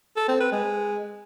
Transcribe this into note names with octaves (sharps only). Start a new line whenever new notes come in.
A4
C4
B4
G#3